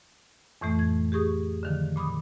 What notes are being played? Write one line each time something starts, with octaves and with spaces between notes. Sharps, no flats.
F2 A2 E3 A3
G#6
G4 G#4 C#6 D#6
D3 D#3 F3
A#2 B5 D6 D#6